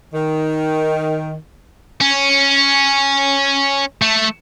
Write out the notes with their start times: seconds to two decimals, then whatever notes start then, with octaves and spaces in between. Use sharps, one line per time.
0.14 D#3
2.01 C#4
4.02 A3